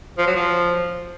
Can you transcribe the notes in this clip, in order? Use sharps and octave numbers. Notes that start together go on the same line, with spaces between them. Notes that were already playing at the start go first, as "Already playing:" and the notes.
F3
F#3
F3